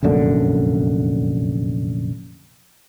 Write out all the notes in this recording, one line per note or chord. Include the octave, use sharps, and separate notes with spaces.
F1 A#1 F#2 D3